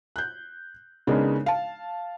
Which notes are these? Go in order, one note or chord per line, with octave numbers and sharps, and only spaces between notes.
F#6 G6
C#3 G#3 B3 D4 D#4 A#4
F5 A5